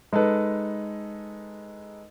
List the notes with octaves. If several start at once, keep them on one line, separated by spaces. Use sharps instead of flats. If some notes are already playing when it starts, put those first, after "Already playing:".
G#3 D#4 A4 B4